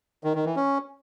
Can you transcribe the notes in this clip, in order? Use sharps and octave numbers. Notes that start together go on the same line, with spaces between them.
D#3
D#3
E3
C#4